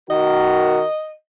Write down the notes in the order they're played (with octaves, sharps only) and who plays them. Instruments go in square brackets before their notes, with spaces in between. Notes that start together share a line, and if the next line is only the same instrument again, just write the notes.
[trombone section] D#3 F#4 A#4 [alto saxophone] D#5